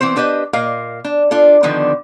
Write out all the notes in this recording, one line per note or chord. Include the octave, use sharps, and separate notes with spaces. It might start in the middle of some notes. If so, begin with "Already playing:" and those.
E3 B3 C4 C5
D4 G4 B4 C5 D#5
A#2 A#4 D#5 F5
D4
D4 F4 A4
D3 D#3 F3 B3 D4